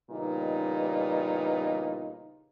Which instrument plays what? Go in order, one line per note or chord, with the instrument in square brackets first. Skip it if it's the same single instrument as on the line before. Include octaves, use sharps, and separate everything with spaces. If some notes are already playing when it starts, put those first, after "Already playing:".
[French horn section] A#2 C#3 E3 G3 B3 D#4